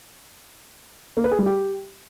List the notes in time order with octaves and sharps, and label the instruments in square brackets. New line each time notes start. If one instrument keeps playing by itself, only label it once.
[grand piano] A#3
B4
G#4
G3
G4